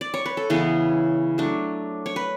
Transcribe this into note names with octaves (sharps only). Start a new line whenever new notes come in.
D5
C#5
B4
A4
C#3 E3 B3 E4 G#4
F#3 A3 D4
C#5
B4